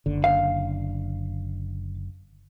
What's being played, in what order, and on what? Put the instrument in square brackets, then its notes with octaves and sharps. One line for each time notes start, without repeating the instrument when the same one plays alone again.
[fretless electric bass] F#1 D3
[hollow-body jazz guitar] F5